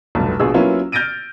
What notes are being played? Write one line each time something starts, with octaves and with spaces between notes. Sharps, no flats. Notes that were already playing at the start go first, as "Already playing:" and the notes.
F1 B1 G2
A#1 B2 G#4 E6
F#3 A#3 B3 C#4 E4 F4
F6 G6 A6 A#6 D7 D#7